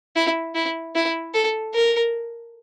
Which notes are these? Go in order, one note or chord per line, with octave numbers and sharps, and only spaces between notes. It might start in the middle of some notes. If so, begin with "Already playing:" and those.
E4
E4
E4
A4
A#4